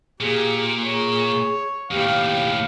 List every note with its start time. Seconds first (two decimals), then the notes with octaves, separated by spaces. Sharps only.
0.20 A#2 G4 G#4
0.84 G#4 C#5
1.91 D#2 A2 G4 F5